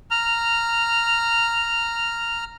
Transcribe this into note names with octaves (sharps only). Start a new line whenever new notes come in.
A#5 F6